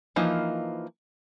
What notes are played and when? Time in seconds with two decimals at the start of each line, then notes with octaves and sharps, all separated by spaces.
0.16 E3 F3 A#3 D#4